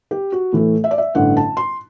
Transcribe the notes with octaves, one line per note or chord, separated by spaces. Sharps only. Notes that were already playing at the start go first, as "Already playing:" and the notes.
G4
F#4
A2 E3 A3
E5
D5
E5
A1 G2 D3 F#5
A5
C6